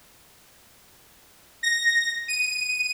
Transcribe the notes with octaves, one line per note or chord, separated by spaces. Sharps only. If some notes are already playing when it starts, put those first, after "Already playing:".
A#6
D#7